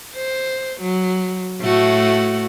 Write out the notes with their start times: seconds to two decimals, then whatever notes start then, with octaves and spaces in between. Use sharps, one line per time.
0.16 C5
0.81 F#3
1.61 A2 A3 F#4